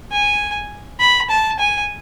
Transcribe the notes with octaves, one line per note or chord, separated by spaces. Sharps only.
G#5
B5
A5
G#5